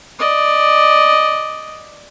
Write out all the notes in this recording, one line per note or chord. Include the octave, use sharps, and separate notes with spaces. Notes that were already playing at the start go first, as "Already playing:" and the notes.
D5 D#5